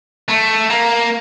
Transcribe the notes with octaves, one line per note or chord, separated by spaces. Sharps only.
A3
A#3